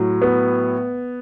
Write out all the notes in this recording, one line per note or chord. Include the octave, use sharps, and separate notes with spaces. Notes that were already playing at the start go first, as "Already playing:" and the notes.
Already playing: A2 F#3
B3